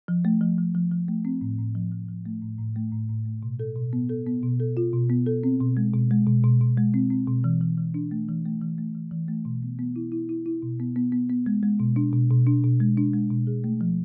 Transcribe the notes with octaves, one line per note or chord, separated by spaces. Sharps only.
F3
A3
F3
F3
F3
F3
A3
C4
A2
A2
F3
F3
F3
A3
A2
A2
A3
A2
A2
A3
B2
A4
B2
B3
A4
B3
B2
A4
F4
B2
B3
A4
C4
B2
G#3
B2
G#3
B2
B2
B2
G#3
C4
C4
B2
E3
E3
E3
D4
A3
E3
A3
E3
A3
E3
E3
A3
B2
B3
B3
E4
E4
E4
E4
B2
B3
B3
B3
B3
G#3
G#3
B2
D4
B2
B2
D4
B2
G#3
D4
G#3
B2
G#4
A3
F3